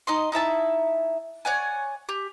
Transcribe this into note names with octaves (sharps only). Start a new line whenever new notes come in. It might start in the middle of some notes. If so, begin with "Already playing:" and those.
D#4 D#5 C6
D#4 E4 E5 A5
C#5 D5 F#5 G#5
G4